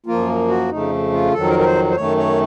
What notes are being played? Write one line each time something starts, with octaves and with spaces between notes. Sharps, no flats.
F#2 F3 A#3 F4
F#4
F2 C#3 A3 D#4
F4
F2 D#3 F#3 A4
A#4
A#4
C5
C5
F#2 D#3 A3 C#5
C#5